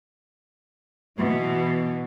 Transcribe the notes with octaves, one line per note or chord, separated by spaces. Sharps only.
B2 E3